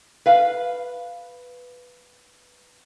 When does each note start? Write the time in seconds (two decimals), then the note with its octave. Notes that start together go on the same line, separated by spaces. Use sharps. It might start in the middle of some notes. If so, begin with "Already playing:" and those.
0.26 B4 F5